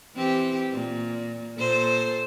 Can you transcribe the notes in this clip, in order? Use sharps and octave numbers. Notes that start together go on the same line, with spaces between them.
E3 C4 G4
A#2
A#2 A4 C5